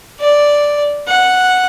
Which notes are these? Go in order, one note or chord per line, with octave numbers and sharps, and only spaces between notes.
D5
F#5